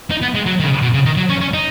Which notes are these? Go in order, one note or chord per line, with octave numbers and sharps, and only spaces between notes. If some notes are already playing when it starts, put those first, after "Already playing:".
D#4
B3
G#3
F#3
D#3
C#3
B2
C#3
D#3
F#3
C#4
C#4
D#4